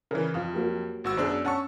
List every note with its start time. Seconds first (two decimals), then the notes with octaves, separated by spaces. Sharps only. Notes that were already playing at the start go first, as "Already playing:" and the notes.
0.11 C#3 E3 A#4 B4
0.34 F2 F4 F5 D#6
0.53 F#3 A#3 G4
1.04 G#1 F#4 E6
1.17 F#2 B3 D4 G#4 C5
1.45 C#4 F#5 A5 C#6